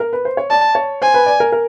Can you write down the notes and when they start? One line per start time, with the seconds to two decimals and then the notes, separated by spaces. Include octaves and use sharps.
0.00 A#4
0.13 B4
0.25 C5
0.37 C#5
0.50 D5 A5
0.75 C#5
1.02 C5 G#5
1.14 B4
1.26 D5
1.40 A#4
1.52 A#4